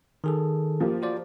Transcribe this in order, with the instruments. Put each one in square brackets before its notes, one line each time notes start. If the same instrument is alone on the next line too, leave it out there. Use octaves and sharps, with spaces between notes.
[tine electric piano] D#3 G#4 A4
[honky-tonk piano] F3 A#3 G4
[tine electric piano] F#4 C5 D5